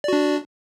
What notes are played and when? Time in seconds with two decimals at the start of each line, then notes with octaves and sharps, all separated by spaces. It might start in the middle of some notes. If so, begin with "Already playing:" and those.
0.04 D5
0.08 F#4
0.13 D4